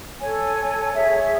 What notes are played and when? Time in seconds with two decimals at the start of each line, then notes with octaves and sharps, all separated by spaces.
0.20 A4 C#5 G#5
0.95 G#4 C#5 E5